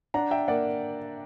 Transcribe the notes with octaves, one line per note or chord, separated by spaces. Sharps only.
D4 F#5 A#5
E5 G5
A#3 D5 F#5